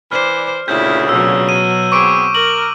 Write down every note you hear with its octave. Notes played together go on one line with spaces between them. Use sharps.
E3 C5 D5 F6
D2 A#2 C#3 E4 G6
B2 F#3 E6
D#7
B3 C4 G#4 C#6 D6 D7
A#4 F#7